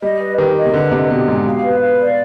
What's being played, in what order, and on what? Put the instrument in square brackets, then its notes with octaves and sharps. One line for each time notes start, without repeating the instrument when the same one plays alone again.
[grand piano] G3 [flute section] D#5
[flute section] B4
[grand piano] D#3 [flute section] G4
[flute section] D#5
[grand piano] C3
[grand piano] D3 [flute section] B4
[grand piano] C3 [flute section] D#5
[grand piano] B2 [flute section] G4
[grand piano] G#2 [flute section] G4
[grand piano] B2 [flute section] F5
[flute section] B4
F5
D5